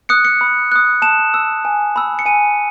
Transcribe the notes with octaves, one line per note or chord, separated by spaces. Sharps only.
D#6 F#6 C#7
C#7
B5
D#6 F#6
A5 E7
E6
G#5
B5 E6
C#7
G#5 D#7